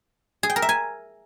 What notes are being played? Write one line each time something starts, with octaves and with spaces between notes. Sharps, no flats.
G#4
G5
A#4
E5
G#5